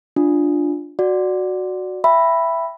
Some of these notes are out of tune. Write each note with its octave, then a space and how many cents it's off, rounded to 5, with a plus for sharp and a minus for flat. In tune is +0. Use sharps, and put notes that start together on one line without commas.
D4 +0 F4 +0
F#4 -5 D5 +5
E5 +10 G5 +0 B5 +0